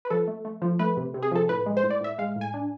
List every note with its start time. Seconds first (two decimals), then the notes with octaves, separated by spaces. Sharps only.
0.05 B4
0.10 F3 A4
0.28 A3
0.45 A3
0.62 F3
0.79 A3 B4
0.97 C3
1.14 C3
1.22 G#4
1.32 F3 A4
1.49 A2 B4
1.66 G#3
1.77 C5
1.84 A2
1.90 D5
2.01 A2 E5
2.18 G#3 F5
2.36 A2
2.41 G#5
2.54 D4